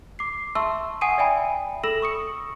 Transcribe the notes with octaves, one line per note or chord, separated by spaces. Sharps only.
D6 C7
E5 A5 C6 C#6 E6
F#5 G#5 D#6 C7 D#7
D5 E5 G5 G#5 B5
A4 B5 E6 A#6 E7 F#7
C#6 D#6 C#7